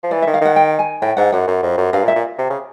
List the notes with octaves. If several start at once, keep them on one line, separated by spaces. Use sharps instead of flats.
F3
E3 D5
E5
D#3
F5
D#3 F#5
G5
G#5
A2 G5
G#2 F#5
F#2 F#5
F#2
F2
F#2
G2 F5
A#2
E5
A#2
C3
C#3